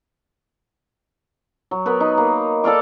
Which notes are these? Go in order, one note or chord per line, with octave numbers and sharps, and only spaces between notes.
F#3
B3 A#4 B4
D#4
A#3
A4 D5 F5 D6